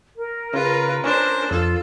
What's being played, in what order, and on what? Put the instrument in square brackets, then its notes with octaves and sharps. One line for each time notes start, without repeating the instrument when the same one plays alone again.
[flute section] A#4
[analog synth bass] C#3 [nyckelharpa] F4 B4
[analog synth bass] C#4 [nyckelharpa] D4 C5
[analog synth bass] F2 [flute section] F4 [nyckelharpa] A4